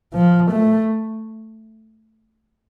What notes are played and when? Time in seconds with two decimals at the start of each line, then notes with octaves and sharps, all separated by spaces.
0.14 F3
0.51 A3